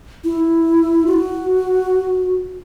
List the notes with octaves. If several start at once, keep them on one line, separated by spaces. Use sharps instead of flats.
E4
F#4